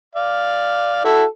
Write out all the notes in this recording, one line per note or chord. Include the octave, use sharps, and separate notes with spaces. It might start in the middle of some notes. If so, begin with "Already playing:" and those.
D5 F5
E4 F#4 A4 E6